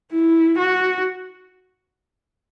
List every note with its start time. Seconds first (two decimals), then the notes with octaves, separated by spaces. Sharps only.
0.12 E4
0.59 F#4